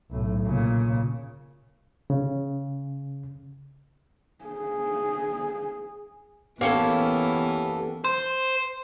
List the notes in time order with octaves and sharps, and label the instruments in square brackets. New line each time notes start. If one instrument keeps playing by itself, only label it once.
[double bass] B1 A2
A#2 C#3
[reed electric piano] C#3
[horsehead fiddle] G#4
[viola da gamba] E3 [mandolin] A#3 C#4 A4 [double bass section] B3 [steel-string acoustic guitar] G4 C#5
[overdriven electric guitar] C5